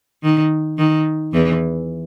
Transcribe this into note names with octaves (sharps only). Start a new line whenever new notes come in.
D#3
D#3
E2 E3